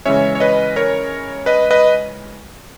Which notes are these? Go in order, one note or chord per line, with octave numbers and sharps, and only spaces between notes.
C#3 E3 G#3 C#4 C#5 E5
C#5
B4 D#5
A#4 C#5
B4 D#5
B4 D#5